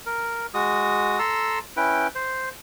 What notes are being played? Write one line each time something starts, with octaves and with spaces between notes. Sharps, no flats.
A#4
G#3 F#4 D#6
A4 A#5 C6 E6
C#4 E4 B4 G5
C5